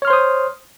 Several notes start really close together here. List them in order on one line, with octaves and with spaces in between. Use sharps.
C#5 F6 C6 C5 D#6